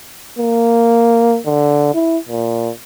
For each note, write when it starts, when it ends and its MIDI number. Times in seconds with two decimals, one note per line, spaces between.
0.39 1.38 58
1.46 1.93 50
1.94 2.18 64
2.29 2.70 46